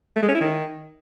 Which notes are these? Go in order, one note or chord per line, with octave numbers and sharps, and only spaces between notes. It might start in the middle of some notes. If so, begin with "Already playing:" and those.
A3
G#3
C#4
E4
D#3